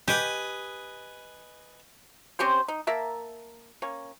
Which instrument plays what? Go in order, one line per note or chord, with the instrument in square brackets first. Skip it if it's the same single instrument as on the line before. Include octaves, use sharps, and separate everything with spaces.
[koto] G4 [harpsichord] B4 D#5 G#5
[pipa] C4 C#4 G4 C5
D#4
A#3 A#4 E5 A5
A#3 C#4